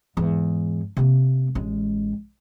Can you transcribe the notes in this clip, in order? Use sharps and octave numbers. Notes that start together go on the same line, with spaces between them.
E2 G#2
C3 A#3
A1 G#3